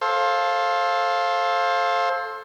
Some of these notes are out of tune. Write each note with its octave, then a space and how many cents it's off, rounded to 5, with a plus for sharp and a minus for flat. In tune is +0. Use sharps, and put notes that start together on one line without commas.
A4 -10 C5 +25 F5 +0